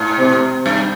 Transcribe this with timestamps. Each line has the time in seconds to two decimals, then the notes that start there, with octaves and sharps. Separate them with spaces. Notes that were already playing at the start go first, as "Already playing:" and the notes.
Already playing: G#2
0.19 C3
0.66 G2